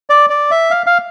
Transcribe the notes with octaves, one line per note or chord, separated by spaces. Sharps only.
D5
D5
E5
F5
F5